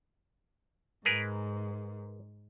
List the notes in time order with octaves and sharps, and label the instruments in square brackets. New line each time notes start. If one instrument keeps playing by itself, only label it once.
[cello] G#2 [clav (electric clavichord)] G#4 A#4 B4